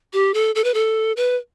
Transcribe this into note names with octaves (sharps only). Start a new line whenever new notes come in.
G4
A4
A4
B4
A4
B4